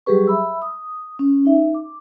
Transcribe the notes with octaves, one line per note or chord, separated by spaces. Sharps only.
F#3 G3 G4 G#4 B4 C#6
E5 B5 E6
D#6
C#4
D#4 E5
D6